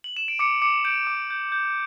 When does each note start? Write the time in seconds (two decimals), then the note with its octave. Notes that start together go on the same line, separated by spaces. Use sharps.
0.04 F#7
0.17 E7
0.28 D7
0.39 D6 C#7
0.62 D6 C#7
0.85 G6 D7
1.07 D6
1.30 G6
1.52 G6